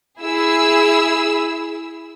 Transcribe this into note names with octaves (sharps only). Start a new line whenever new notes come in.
E4 G#4 E6